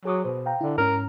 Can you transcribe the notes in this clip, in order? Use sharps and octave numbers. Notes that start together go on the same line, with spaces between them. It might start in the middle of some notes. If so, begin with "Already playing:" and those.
F#3 G#4 D6 D#6
B2 C5
F5 G5 A#5
D3 E4
G#2 C#4 A#4